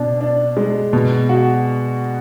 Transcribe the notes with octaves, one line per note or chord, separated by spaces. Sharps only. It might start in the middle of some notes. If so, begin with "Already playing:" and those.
Already playing: B2 D4
D4
G#3
B2
F#4